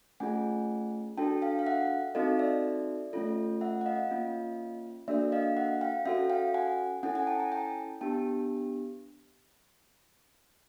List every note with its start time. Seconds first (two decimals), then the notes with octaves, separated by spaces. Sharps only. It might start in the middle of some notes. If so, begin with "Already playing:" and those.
0.20 A3 C#4 F4 G#4 F#5 G#5
1.17 D4 F#4 A4 G5 A5
1.42 F5 G5
1.59 F5
1.66 E5 F#5
2.15 C4 D#4 F#4 A4 D#5 F5
2.39 D5 E5
3.13 A3 C#4 F4 A4
3.61 E5 F#5
3.81 F#5
3.86 D#5 F5
4.11 A#3 C#4 F4
5.08 A#3 D4 F#4 A4 D5 E5
5.32 D#5 F5
5.57 E5 F#5
5.81 F5 G5
6.05 C#4 F#4 A4 E5 F#5
6.30 F5 G5
6.54 F#5 G#5
7.03 C#4 E4 A4 F#5 G#5
7.15 F#5 G#5
7.27 G5 A5
7.39 G#5 A#5
7.52 G5 A5
8.01 B3 D4 G4 G5 A5